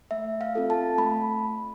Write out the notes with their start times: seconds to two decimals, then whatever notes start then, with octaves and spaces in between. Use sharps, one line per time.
0.11 A3 E5
0.41 F5
0.55 C4 F4 A4
0.70 A5
0.98 A3 B5